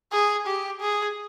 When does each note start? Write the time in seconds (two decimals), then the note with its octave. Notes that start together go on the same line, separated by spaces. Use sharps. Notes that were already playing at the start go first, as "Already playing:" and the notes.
0.13 G#4
0.47 G4
0.81 G#4